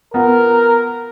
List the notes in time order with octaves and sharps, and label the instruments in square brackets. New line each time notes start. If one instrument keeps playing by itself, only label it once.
[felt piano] B3 F4 F#5 [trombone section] A#4